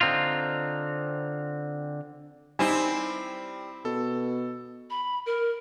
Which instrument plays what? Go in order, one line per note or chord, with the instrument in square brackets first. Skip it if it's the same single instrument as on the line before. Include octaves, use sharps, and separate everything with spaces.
[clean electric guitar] D3 C4 D#4 F4
[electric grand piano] G3 [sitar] C4 E4 [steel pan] D#4 G#5
[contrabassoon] B2 [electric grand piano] A4
[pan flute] B5
A#4